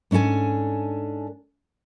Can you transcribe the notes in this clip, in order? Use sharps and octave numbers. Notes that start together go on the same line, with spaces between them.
G#2 C#4 D4 A4 G#5